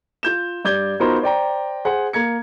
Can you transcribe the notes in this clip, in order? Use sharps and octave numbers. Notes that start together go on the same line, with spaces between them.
F4 G6 E7
G2 D5 G6 G#6 G7
B3 D#4 F4 F#4 A#4 C5
C5 D5 G5 A#5
G#4 C5 F#5
A#3 A#5 G#6 C#7